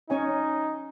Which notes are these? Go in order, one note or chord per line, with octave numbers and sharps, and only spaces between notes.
C#4 D#4 C#5 G#5